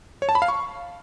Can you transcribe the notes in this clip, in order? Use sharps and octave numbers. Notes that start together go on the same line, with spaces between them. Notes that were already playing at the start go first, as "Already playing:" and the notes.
C#5
A5
B5
F5
C#6